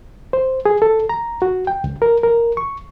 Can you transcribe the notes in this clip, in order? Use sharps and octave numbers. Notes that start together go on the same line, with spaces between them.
C5
G#4
A4
A#5
F#4
G5
C#2
A#4
A#4
C#6